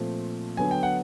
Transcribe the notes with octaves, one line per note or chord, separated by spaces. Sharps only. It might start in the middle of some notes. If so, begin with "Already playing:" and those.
Already playing: A#2 F3 A3 C4
D3 F#3 B3 G#5
G5
F#5